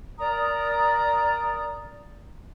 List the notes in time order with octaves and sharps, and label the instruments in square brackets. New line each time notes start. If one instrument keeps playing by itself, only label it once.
[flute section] A#4 D5 A#5 D#6